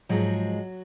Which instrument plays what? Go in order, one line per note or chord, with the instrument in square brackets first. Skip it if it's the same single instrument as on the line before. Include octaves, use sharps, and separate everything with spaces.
[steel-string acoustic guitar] G#2 F3 F#3 G#3 F#4